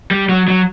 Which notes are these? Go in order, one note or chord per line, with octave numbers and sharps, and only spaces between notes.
G3
F#3
F#3